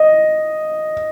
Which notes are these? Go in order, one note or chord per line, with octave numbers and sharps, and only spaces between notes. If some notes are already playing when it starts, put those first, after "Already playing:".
Already playing: D#5